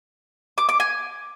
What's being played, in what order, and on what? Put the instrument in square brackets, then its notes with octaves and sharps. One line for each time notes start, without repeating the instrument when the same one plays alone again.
[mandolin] D6
D6
G#5